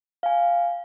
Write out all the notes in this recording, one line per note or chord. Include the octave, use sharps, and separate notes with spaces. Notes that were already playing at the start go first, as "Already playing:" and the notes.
F5 G#5